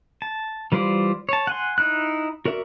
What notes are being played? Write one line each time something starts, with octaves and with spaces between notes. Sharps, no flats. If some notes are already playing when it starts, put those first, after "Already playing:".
A5
E3 G3 F4 C5 D5
C#5 A5
F#5 G#5 C6
D#4 E4 F#6
F#4 A#4 D5 E5